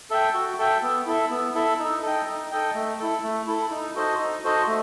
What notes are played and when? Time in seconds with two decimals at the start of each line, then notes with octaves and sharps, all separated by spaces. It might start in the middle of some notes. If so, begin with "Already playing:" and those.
0.10 A4 E5 G5
0.34 F#4
0.59 A4 E5 G5
0.82 B3
1.06 E4 A4 E5
1.30 B3
1.55 E4 A4 E5
1.79 D#4
2.02 A4 D#5 G5
2.27 D#4
2.51 A4 D#5 G5
2.74 A3
2.99 E4 A4
3.23 A3
3.47 E4 A4
3.71 D#4
3.95 F#4 A4 C5 D#5
4.19 D#4
4.44 F#4 A4 C5 D#5
4.67 A3